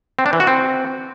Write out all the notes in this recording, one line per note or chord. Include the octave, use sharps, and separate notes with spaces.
C4
D4
E3
F#4
C4